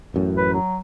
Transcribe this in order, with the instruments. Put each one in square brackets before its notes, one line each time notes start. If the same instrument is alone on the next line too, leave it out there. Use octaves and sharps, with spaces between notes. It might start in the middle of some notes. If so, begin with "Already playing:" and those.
[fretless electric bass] A1 F#2 A2
[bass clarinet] B4
F#3